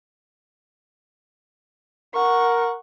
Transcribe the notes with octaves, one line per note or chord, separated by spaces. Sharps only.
A#4 F#5 C#6